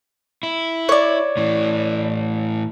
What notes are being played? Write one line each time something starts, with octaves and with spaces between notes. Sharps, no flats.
E4
C#5 D5
A2 E3